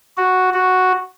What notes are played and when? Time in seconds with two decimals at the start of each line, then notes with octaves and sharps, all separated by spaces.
0.17 F#4
0.54 F#4